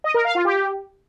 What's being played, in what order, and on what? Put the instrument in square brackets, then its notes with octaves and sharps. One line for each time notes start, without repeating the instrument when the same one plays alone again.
[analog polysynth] D#5
A#4
F5
F4
G4